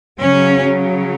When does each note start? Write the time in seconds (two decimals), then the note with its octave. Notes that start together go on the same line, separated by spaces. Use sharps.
0.19 C#3 F#3 C#4